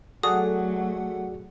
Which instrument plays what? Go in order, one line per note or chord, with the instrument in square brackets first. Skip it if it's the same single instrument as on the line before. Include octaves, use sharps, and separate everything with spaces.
[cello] F#3 A3 [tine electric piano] F#4 G#4 D5 [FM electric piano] A4 F#5 [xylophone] D#6